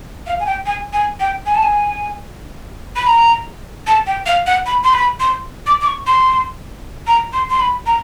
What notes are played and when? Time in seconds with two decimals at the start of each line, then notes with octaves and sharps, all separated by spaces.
0.27 F5
0.40 G#5
0.46 G5
0.66 G#5
0.93 G#5
1.20 G5
1.46 G#5
1.55 A5
1.63 G#5
2.96 B5
3.07 A#5
3.87 A5
4.07 G5
4.26 F5
4.47 F#5
4.66 B5
4.83 C6
4.93 B5
5.20 C6
5.67 D6
5.81 D6
5.86 C#6
6.07 C6
7.07 A#5
7.33 C6
7.49 C6
7.60 B5
7.86 A#5